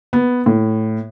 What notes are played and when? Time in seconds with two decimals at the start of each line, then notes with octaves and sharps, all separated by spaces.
0.13 B3
0.46 A2